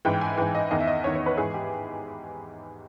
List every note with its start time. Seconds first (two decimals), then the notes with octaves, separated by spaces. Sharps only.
0.05 G#2 E3 G5
0.21 G#5
0.37 G#2 E3 G5
0.55 D#5
0.71 E2 D#3 D#5
0.80 E5
0.87 D#5
1.04 E2 C#5
1.07 D#3
1.15 C#5
1.26 B4
1.37 G#2 E3 G#4
1.54 G4